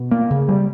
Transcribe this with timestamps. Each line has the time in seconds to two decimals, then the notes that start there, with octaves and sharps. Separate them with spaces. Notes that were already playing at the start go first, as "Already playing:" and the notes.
Already playing: B2
0.11 A#3
0.30 C#3
0.48 G3